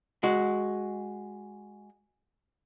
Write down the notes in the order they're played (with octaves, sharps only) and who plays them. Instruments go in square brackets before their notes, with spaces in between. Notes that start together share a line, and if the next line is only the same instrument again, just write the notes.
[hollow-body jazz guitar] G#3 F#4